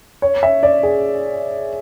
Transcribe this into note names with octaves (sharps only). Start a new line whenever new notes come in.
C#5
E5
D5
G#4